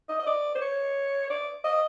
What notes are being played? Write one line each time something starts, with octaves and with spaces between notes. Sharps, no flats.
D#5
D#5
D5
C5
C#5
D5
D#5